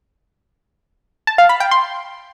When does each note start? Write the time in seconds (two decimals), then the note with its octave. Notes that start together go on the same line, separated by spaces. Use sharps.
1.27 A5
1.38 F5
1.49 B5
1.60 G5
1.71 C6